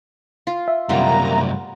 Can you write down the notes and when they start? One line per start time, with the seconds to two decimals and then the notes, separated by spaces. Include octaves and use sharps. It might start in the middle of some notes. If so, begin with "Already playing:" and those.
0.47 F4
0.68 E5
0.89 C2 F#2 G3 B3 F4 A#5